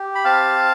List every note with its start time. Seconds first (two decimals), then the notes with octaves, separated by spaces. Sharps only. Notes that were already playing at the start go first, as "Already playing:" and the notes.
Already playing: G4
0.15 B5
0.24 C4 F5 A5